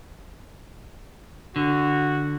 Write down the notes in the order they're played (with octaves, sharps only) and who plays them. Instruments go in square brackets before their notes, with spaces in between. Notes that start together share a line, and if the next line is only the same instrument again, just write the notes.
[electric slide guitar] D3 [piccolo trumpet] F#4